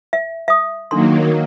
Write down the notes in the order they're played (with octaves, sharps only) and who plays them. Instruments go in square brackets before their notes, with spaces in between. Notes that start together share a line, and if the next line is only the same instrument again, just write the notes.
[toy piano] E5
E5 D#6
[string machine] D#3 F#3 A#3 [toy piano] D4 A4 C6